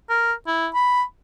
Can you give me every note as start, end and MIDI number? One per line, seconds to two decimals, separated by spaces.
0.09 0.33 70
0.47 0.68 64
0.74 1.03 83